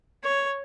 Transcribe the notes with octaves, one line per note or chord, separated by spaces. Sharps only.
C#5